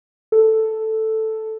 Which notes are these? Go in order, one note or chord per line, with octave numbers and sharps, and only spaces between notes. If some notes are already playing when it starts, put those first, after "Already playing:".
A4